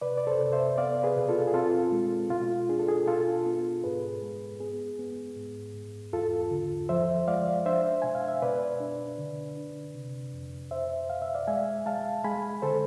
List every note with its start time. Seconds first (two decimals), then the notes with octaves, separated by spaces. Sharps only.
0.01 C3 B4 D5
0.18 D5
0.27 A4 C5
0.40 C3
0.53 C5 E5
0.78 B3 D5 F5
1.03 G#4 B4
1.16 B2
1.29 F4 A4
1.48 G#4
1.54 C4 F4 A4
1.92 G#3
2.30 B2 F4
2.69 D4 G#4
2.79 A4
2.89 G#4
3.07 B2 F4 A4
3.46 B3
3.84 G#2 G#4 B4
4.22 G#3
4.60 B3 G#4
4.99 B3
5.37 G#2
5.74 G#2
6.13 E2 F4 A4
6.51 D3
6.89 F3 C5 E5
7.28 G#3 D5 F5
7.66 D4 C5 E5
8.02 B2 G#5
8.15 F5
8.28 E5
8.42 B2 B4 D5
8.80 D4
9.18 D3
9.57 D4
9.95 C3
10.34 F2
10.71 B2 C5 E5
11.10 B2 F5
11.22 E5
11.34 D5 F5
11.47 G#3 E5 G#5
11.86 G#3 F5 A5
12.24 G#3 G#5 B5
12.62 D3 A4 C5